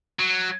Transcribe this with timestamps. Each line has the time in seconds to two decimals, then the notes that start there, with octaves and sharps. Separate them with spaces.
0.20 F#3